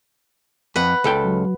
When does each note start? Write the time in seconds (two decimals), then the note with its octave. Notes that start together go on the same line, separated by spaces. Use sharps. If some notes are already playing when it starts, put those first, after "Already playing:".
0.76 F2 B4 F#5
1.04 C#2 A4 G5
1.25 F#3